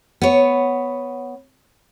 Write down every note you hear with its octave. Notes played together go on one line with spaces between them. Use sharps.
B3 C#5